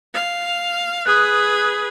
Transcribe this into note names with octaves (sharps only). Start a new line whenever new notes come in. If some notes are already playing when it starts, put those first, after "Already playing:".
F5
G#4 B4 D#6 F#6